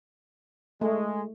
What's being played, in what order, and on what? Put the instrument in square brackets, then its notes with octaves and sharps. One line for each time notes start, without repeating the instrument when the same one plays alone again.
[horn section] G#3 [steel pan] A3